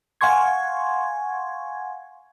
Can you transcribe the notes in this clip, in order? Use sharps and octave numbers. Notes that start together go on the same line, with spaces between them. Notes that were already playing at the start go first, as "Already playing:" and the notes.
F5 F#5 G#5 C6 C#6 G#6